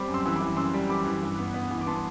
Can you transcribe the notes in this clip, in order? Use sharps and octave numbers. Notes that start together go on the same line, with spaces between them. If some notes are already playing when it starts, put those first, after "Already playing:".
Already playing: G3 C4 B5 D6
F#2
C6 E6
E3 E6
E3 B5 D6
F#2 C6 E6
G3
E3 B5 D6
E3
G2
B3
B3
E3
D6
B3 A5 C6